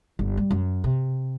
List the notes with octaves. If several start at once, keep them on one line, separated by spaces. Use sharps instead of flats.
G1
G3
F#2
C3